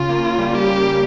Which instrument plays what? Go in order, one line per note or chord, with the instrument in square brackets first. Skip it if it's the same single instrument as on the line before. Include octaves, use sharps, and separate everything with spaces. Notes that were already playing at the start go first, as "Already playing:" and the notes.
Already playing: [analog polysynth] C#3 [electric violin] F4
[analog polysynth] A#3
A#3
G3
[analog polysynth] A#3 [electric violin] G4
[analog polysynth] A#3
A#3